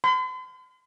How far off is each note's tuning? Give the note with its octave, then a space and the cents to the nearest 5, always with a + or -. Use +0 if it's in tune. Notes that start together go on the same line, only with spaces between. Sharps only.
C6 -45